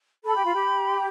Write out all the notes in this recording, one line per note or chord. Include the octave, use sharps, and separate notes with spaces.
A4 B5
G4
F4
G4